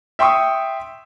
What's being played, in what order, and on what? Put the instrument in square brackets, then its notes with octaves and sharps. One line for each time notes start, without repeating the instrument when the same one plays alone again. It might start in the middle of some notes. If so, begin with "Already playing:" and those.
[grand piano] E5 G5 C6 C#6 D#6